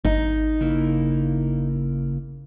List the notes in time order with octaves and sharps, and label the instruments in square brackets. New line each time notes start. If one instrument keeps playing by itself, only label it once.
[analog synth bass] G#1 [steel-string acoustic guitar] D#4
[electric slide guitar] C#3 A#3 E4